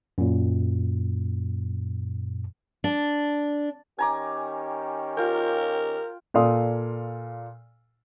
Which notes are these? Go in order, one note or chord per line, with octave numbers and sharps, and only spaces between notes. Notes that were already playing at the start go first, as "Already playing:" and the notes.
F#2 A#2
D4
D#3 C#4 G4 G#5 A#5 D6
F4 A#4 G5
A#2 A4 D5 F5 C6 D#6